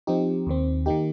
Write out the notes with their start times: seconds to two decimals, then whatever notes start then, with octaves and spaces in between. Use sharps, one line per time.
0.07 F3 C4 D#4 G4
0.47 D#2 D#3 C4
0.86 D#3 A#3 D#4 G4